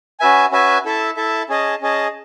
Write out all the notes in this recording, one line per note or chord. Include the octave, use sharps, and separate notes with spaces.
C#4 F#4 B4 E5 G#5
C#4 F#4 B4 E5 G#5
E4 A4 E5 A5
E4 A4 E5 A5
C#4 G#4 D#5 A5
C#4 G#4 D#5 A5